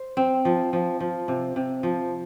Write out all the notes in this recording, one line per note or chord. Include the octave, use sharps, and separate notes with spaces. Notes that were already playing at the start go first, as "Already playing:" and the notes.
Already playing: C5
C4
F3
F3
F3
C3
C3
F3